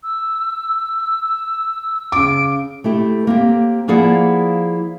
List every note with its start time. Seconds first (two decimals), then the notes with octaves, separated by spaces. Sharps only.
0.03 E6
2.12 C#3 D6 D7
2.84 A3 E4 G4 A4
3.27 A#3 C4 G4
3.88 F3 A#3 E4 G#4 D5 F#5